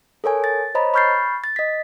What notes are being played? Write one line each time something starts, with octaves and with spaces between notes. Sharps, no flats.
A4 A#4 C#5 G#5
A6
C5 C#5 D#5 A#5 B5
B5 C#6 F6 G6 A6 C7
A6
D#5 B6